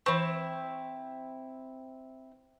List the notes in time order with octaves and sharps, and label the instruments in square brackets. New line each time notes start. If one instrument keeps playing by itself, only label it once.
[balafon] E3 C#6 [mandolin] C4 E4